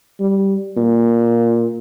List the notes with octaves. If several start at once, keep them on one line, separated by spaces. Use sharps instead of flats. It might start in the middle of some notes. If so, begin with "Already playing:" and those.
G3
A#2